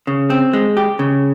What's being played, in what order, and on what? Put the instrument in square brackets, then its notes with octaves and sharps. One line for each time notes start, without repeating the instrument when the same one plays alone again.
[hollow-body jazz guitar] C#3
C4
G#3
G4
C#3